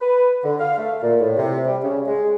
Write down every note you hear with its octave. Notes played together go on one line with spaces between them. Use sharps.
B4
D3
F5
A3
A#2
A2
C3
G3
C#3
G#3